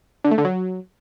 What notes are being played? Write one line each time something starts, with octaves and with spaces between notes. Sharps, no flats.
D3
A3
D3
F#3